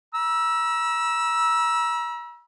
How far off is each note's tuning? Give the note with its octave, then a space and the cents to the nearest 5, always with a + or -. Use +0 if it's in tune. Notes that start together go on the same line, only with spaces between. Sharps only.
A#5 +45 E6 +0